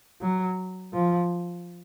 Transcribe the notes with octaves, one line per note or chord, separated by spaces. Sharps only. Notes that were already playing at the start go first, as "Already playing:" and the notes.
F#3
F3